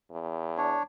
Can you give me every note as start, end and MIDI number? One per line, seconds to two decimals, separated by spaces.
0.11 0.74 40
0.58 0.83 62
0.58 0.83 73